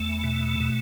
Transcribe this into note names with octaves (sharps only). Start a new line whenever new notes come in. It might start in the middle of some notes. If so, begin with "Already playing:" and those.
Already playing: E2 A3
B2
B2